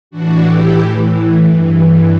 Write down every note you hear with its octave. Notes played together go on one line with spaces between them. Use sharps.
A2 E3 D4 F#4
E4 G4
G2 E3